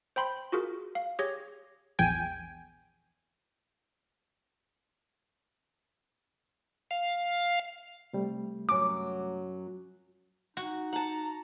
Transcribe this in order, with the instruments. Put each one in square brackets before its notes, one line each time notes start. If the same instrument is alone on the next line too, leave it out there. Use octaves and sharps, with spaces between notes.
[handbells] C5 G5 B5 C6
F4 F#4 G#4 A#4
F5
G4 G#4 C#5 A#6
[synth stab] A#1 E2 G5 G#5
[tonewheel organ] F5
[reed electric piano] C3 G3 A3
[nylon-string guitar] F#2 F#3 [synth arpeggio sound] D6
[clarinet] D#4 [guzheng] F#4
[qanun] F#5 A5 [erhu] A#5